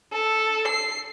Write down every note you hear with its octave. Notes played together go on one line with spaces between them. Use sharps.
A4
C7